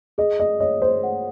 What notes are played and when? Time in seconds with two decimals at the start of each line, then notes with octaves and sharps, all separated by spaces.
0.18 G#4 D#5
0.40 D#5
0.60 C#5 D#5
0.82 C5
1.03 F#5